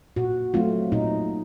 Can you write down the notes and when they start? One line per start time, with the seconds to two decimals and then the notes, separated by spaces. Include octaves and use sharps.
0.16 A#2 F#4
0.54 F#3 A3 C4 F4
0.92 A#2 D#4